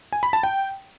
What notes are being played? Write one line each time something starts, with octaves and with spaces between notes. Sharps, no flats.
G#5
B5
A5
G5